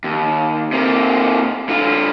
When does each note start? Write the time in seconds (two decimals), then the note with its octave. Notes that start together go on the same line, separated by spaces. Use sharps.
0.04 D#2
0.72 C3 A#3
1.69 D3 F4